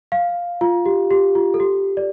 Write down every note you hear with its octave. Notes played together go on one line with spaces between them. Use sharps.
F5
F4
G4
G4
F4
A4
G4
D5